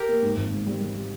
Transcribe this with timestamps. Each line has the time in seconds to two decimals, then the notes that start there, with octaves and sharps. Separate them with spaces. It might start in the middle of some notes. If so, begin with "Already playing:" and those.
Already playing: G4 A#4
0.09 A#3
0.22 G#2
0.37 G#1
0.52 G#2
0.67 G3
0.81 G3
0.95 G3